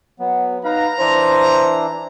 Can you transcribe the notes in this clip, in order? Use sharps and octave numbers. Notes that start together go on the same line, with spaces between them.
F#3 B3
D#4 B4 F5 A#5
E3 D4 E4 C5